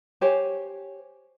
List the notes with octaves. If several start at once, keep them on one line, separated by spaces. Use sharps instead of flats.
G4 C5 C#5 G#5